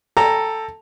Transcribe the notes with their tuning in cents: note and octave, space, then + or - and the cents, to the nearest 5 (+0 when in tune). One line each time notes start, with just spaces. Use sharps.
A4 +5 G5 +25 A#5 +0